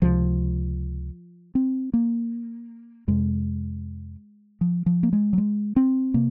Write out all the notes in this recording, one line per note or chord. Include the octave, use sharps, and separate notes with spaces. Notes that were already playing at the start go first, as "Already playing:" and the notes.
C#2 C3 F3
C4
A#3
F2 C3 G#3
F3
F3
A#3
G#3
F#3
G#3
C4
C3 A#3